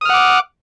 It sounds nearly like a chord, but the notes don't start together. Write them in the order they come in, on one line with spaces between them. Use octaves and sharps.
D#6 F6 F#5 D6